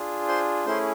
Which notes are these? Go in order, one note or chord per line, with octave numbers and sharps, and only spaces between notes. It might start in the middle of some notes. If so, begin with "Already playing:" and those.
Already playing: D4 F4 G#4
C5 C6
A3 C#4 E4 G#4 C5 C6